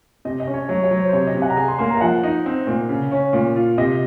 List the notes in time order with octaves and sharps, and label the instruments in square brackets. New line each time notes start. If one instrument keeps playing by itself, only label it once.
[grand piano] C3 [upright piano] D#5
[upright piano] D#5
[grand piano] C#4
[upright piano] C#5
[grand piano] F#3 [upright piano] C#5
[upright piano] C#5
[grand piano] F#3
[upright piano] C5
C5
[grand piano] C3 [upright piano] C#5
[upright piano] D#5
[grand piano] C3
[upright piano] F#5
A#5
[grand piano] G#4 [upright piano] G#5
[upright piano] C6
[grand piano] A#3 [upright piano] C6
[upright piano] A#5
F5
[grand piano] F3 [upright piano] F#5
[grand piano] D#4
C4
A#2
C#3
C#4
A#2
F4
[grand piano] C3 [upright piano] D#5